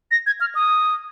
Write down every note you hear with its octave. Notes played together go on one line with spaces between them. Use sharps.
A#6
G#6
F6
D#6